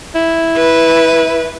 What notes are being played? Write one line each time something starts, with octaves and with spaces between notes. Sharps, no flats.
E4
B4